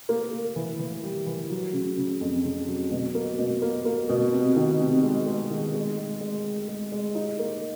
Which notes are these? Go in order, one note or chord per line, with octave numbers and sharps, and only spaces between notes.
A#3
A#3
E3
E3
G3
E3
F#3
C#3
C#3
F2
C#3
F#3
B2
A#3
B2
A#3
A#3
B2
C3
D#3
C3
G#3
G#3
D#3
G#3
G#3
G#3
G#3
G#3
G#3
D#4
A#3